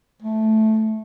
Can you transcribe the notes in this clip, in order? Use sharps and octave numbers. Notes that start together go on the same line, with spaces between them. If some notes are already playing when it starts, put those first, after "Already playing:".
A3